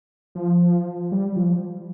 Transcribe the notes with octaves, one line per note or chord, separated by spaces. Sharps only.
F3
G3
F3